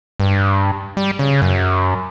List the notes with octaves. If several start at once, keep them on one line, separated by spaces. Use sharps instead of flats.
G2
G3
C#3
F#2